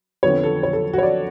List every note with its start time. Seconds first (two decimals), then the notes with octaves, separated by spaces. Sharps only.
0.23 F2 D3 F3 B3 C#5
0.43 A4
0.63 C#5
0.73 A4
0.93 F#4
0.98 C#5
1.03 D5